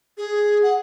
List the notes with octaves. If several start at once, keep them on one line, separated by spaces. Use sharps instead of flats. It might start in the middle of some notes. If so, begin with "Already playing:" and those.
G#4
F#5